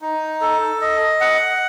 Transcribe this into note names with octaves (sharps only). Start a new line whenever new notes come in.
D#4
A4
D#5
F#5